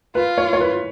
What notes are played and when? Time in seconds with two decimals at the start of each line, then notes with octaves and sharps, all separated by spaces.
0.15 F4 B4
0.38 C#5
0.53 C#5
0.61 B4